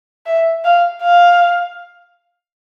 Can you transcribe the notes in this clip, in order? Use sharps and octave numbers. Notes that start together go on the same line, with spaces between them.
E5
F5
F5